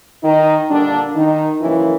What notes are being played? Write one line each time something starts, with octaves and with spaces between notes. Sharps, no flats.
D#3 D#4
A#2 D3 G3 A#3 D4
D#3 D#4
F#2 C#3 E3 F3 A#3 E4